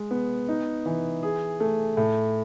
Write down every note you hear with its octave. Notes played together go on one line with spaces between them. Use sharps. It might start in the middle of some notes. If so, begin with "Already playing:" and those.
Already playing: G#3
B3
D#4
E3
G#4
A3
A2